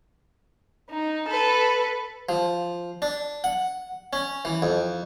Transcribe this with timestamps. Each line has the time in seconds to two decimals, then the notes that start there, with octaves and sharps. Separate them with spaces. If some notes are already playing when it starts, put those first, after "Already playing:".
0.90 D#4
1.28 A4 B4
2.29 F3
3.02 D4
3.44 F#5
4.13 C#4
4.45 E3
4.62 F2